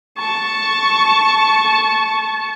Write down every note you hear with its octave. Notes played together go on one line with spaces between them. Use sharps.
A5 C#6